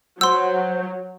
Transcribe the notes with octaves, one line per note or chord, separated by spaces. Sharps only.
F#3 F#4 C5 F#5 C6 E6